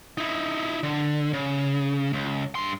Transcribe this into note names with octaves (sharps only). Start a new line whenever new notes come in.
D#4 E4
D3
C#3
C#2
G2 C6